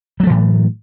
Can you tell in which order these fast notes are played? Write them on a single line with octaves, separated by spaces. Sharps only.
F#3 A3 E3 A2